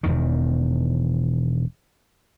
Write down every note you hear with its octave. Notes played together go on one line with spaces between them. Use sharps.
E1 E2 D#3